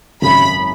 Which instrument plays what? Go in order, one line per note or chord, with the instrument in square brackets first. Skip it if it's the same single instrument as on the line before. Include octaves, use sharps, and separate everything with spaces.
[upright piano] G#1 F#2 C#3 [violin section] B5